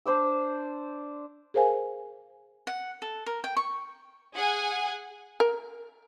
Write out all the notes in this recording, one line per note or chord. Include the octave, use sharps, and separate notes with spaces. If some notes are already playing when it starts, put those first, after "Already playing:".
D4 C5 D5 E6
G#4 A#4 C5 F5 G#5
F#5
A4
A#4
G5
C#6
G#4 F#5 G#5
A#4